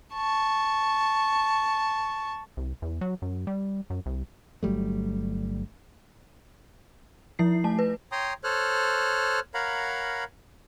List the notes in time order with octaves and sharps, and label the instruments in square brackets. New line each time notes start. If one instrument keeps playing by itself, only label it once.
[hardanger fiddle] A5 C#6
[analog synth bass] C2
E2
F#3
F#2
G3
F#2
C2
[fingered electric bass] G1 F#3 G3 A3
[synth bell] F3 E4 C7
A3 A5
B4
[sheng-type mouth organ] C#5 G5 A#5 C6 D#6
A4 C5 C#5 F6 F#6
A#4 C#5 F5 F#5 A#5 B5